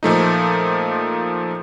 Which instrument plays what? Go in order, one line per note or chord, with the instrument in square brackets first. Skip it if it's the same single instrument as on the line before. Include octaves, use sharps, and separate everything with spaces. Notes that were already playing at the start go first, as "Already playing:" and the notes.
[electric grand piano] A#2 F3 A3 D#4